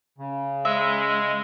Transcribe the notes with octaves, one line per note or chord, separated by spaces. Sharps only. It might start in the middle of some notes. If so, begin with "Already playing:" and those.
C#3
G#3 E5